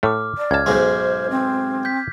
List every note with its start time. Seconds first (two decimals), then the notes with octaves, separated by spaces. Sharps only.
0.03 A2 A3 D6 F6
0.38 D5
0.51 C#2 A5 F6 G#6
0.66 B1 G#2 G#3 C5
1.30 C4
1.85 G6 B6